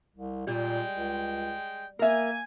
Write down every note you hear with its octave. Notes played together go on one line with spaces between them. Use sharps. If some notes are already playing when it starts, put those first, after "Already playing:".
C2
A#2 G3 G#3 G5
C#2
A#3 A#4 E5 G#5